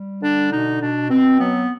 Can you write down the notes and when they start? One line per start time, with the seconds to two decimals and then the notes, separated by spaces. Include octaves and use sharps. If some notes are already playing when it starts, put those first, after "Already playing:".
Already playing: G3
0.22 D3 D4
0.51 B2 D#4
0.81 B2 D4
1.10 B2 C4
1.39 F#3 B3